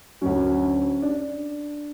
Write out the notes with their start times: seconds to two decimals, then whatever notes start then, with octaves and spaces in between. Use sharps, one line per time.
0.21 D2 D3 F#3 C#4
1.02 D4